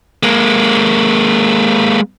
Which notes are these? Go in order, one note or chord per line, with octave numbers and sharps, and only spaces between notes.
G#3 A#3